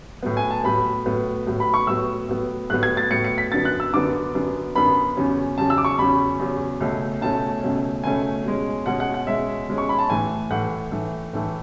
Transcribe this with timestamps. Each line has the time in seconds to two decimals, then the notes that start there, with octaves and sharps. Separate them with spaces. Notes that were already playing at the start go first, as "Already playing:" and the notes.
0.23 A2 F#3 B3
0.37 G#5
0.51 A5
0.64 A2 F#3 B3 B5
1.05 A2 F#3 B3
1.46 A2 F#3 B3
1.60 B5
1.74 C#6
1.87 A2 F#3 B3 E6
2.28 A2 F#3 B3
2.70 A2 F#3 B3 F#6
2.83 G#6
2.97 A6
3.10 A2 F#3 B3 C#7
3.24 C#7
3.38 B6
3.52 F#2 D3 F#3 B3 A6
3.65 F#6
3.80 E6
3.93 F#2 D3 F#3 B3 D6
4.35 F#2 D3 F#3 B3
4.76 F#2 D3 F#3 B3 B5
5.17 E2 C#3 F#3 C#4
5.58 E2 C#3 F#3 C#4 A5
5.70 E6
5.78 D6
5.85 C#6
5.98 E2 C#3 F#3 C#4 B5
6.39 E2 C#3 F#3 C#4
6.80 C#2 B2 A3 C#4
7.21 C#2 B2 A3 C#4 A5
7.63 C#2 B2 A3 C#4
8.04 C#2 B2 A3 C#4 G#5
8.45 B2 G#3 C#4
8.86 B2 G#3 C#4 F#5
9.00 F#5
9.14 F#5
9.27 B2 G#3 C#4 E5
9.68 B2 G#3 C#4
9.78 C#6
9.89 B5
9.99 A5
10.10 A2 E3 A3 G#5
10.50 A2 E3 A3 F#5
10.92 A2 E3 A3
11.33 A2 E3 A3